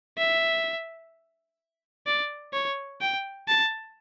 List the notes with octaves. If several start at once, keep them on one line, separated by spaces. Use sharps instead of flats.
E5
D5
C#5
G5
A5